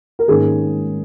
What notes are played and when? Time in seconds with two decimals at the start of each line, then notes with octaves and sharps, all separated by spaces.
0.19 A#4
0.28 G#2 D#3 A#3 C#4 G#4